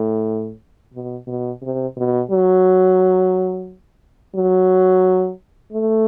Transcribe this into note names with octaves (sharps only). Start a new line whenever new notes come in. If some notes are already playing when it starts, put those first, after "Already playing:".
Already playing: A2
B2
B2
C3
B2
F#3
F#3
A3